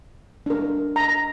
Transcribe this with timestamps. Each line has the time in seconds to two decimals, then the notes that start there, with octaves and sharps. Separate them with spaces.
0.46 D4 A#4
0.96 A#5